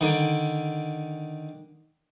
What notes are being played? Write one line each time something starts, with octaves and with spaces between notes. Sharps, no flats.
D3 D#3